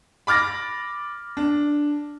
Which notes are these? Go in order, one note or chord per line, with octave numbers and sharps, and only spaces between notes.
B5 D6 F6 A6 A#6
D4